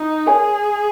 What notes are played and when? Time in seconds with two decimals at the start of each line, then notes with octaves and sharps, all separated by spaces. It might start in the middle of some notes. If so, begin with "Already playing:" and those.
Already playing: D#4
0.26 G#4 A#4 C#5 G#5